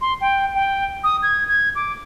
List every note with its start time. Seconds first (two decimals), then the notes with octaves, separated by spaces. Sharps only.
0.01 C6
0.21 G5
0.55 G5
1.04 D#6
1.23 G#6
1.49 G#6
1.75 D6